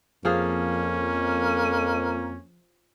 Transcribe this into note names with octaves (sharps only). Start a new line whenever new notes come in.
F2 F3 A#3 C#4 G#4 F5